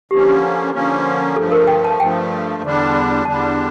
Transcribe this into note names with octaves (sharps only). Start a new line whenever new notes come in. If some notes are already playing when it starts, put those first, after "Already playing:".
D3 F3 A#3 C#4 G4
D3 F3 A#3 C#4
G2 F3 A3 A4
A#4
G5
A5
G2 F3 A3 G5
E2 D3 G3 D4
E2 D3 G3 D4 A5